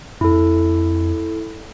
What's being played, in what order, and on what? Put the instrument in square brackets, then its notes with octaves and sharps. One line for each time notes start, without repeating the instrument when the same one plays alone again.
[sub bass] F2 [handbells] E4 A4